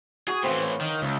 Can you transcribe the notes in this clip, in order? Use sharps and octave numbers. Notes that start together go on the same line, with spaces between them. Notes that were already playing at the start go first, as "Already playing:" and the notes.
F#4 G#4
A2 E3 C4 F5
C#5 F5
D#3
C#2 D#5 E5